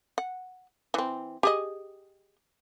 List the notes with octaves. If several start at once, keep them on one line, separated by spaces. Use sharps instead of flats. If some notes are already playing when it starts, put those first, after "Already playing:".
F#5
E3 C4
G4 G#4 D#5